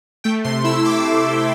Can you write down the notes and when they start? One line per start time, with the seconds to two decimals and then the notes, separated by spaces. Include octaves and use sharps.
0.24 A3 G5
0.44 C3 C6
0.64 E4 E6
0.84 C3 D6